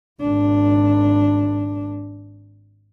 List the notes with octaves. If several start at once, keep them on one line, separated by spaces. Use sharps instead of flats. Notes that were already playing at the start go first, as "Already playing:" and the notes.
G#1 D4